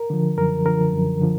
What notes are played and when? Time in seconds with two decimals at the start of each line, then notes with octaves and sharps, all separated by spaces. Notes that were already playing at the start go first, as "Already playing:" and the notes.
Already playing: A#4
0.10 D3 F3
0.38 F#2 A#4
0.65 D3 F3 A#4
0.93 F#2
1.21 D3 F3